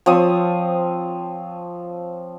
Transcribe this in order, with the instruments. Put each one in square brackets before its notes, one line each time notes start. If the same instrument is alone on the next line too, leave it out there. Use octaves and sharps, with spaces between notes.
[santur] F3 C4 C#5 D#6